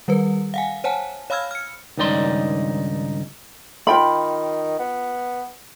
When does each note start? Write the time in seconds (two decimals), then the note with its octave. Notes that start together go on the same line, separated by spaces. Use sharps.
0.08 D#3 G3 A#4 B4
0.54 F5 F#5 G#5
0.84 C5 C#5 F#5 G#5 A5
1.30 C#5 F5 B5 E6 F6 G#6
1.51 F6 C#7
1.97 C#2 G2 D#3 D#4 D5 C6
3.87 D#3 F4 G5 B5
4.79 B3